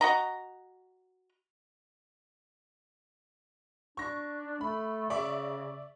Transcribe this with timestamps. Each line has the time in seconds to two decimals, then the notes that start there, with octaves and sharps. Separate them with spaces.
0.01 F#4 D#5 A#5
3.97 D4 C#6 A#6
4.61 A3 B5
5.10 C#3 D5 E5 C#6